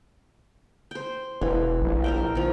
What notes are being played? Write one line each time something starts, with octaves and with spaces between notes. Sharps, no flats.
C5 G5
E1 E3
A#1
A#4 E5 G5
D#3 F3